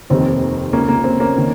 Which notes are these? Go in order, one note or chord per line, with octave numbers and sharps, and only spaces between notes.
F1 D#2 D#3 C4
C#2 C#3 A#3 C#4
A#3
C4
A#3 C#4
D#3